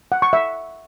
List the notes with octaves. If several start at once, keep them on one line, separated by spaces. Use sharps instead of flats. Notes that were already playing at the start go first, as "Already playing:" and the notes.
F#5
C#6
E5